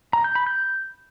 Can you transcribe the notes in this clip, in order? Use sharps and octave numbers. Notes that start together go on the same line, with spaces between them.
A#5
G6
B5
G6